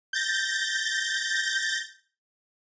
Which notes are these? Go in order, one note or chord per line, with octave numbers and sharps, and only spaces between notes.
G6 A6 A#6